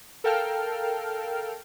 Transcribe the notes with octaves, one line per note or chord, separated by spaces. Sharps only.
A4 A#4 F5 G5 A5 F6